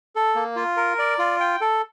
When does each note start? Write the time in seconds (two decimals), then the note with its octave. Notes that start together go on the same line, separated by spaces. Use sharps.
0.16 A4
0.35 A#3
0.56 F4
0.77 A#4
0.99 D5
1.19 F4
1.40 G5
1.61 A4